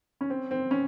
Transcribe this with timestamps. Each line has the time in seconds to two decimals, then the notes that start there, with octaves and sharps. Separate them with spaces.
0.21 C#4
0.30 C4
0.51 C4
0.71 C#4